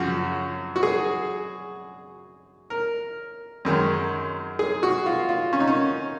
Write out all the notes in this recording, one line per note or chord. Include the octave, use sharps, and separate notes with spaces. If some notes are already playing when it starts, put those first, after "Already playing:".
Already playing: F#2 C#3 F3 F#4
F#4
G#4
A#4
F#2 D#3 G#3
G#4
F#4
F4
F4
C#4
D#4
C#4